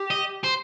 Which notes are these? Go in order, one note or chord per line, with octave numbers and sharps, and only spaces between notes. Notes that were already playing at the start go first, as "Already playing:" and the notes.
Already playing: G4
D#5
C5